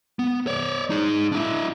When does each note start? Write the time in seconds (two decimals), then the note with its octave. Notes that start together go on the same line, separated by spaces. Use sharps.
0.19 B3
0.47 C#5 D5
0.90 D#4 G#4
1.32 D4 E4